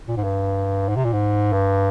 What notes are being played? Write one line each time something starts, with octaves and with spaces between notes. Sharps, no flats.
A#2
G#2
G2
G#2
C3
A#2
G#2
G2